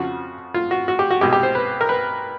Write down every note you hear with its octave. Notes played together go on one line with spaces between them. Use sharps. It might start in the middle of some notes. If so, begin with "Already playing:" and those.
Already playing: F2 C#3 F3 F#4
F4
F#4
F#4
G4
F#4
C2 B2 G#3 G4
G4
C5
B4
A#4
B4